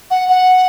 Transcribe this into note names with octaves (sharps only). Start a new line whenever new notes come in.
F#5
F#5